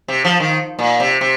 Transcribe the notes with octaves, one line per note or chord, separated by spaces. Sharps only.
C3
F3
D#3
A#2
C3
C3